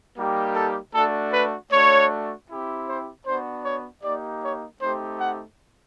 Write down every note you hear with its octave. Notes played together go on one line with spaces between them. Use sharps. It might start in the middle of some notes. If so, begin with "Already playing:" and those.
G3 A#3 D#4 G4
A4
A3 D4 F#4 A4
B4
A3 D4 F#4 C#5
C4 E4 G4
C5
B3 D4 F#4 C5
C#5
A#3 D#4 G4 D5
C#5
A3 C4 D#4 G4 C5
F#5